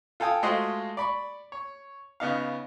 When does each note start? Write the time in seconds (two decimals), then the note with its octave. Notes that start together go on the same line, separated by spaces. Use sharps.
0.20 F4 A4 F5 G5 G#5 D#6
0.43 G#3 A3 F4 F#4 C5 D#5
0.97 D5 B5 C#6
1.52 C#5
2.20 C#3 B3 D#4 F5